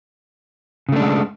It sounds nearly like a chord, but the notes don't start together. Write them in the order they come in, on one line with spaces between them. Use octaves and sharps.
C#3 A3 D4 G#3